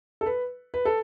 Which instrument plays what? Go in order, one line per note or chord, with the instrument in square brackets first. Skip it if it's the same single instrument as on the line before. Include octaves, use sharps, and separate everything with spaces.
[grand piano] A4
B4
B4
A4